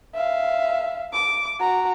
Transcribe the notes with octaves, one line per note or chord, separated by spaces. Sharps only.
E5 F5
D6
F#4 A#5